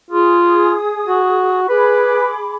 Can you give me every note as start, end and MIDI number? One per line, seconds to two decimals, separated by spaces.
0.11 0.74 65
0.11 1.60 68
0.11 1.60 87
1.07 1.68 66
1.69 2.56 68
1.69 2.29 71
1.69 2.56 83
1.69 2.56 86